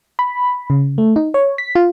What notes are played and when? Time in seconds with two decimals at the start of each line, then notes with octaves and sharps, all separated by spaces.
0.19 B5
0.70 C#3
0.98 A3
1.16 D#4
1.34 C#5
1.58 B6
1.75 F4